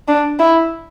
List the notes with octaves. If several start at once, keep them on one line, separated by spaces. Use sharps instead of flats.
D4
E4